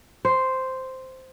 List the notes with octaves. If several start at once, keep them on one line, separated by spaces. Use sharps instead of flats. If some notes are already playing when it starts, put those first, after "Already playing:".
C5